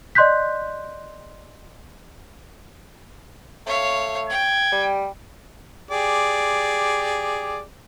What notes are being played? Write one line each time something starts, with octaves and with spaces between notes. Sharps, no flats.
D5 D#5 C6 F#6 G6 B6
A3 C#5 F5
G5 G#6
G3
G4 G#4 D5